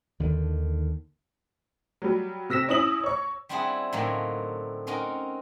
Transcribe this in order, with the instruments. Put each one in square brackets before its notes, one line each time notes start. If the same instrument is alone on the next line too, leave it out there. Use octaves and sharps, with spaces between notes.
[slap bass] D#2 D3 D#3
[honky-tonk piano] F#3 G3
C3 E6 A#6 B6 E7
C#4 E4 D#6 F#7
C#5 C#6
[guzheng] G3 C4 D4 E4 F#4 G#4
A2 D3 F#3 A#3 C4 D#4
C4 C#4 D#4 F#4 A#4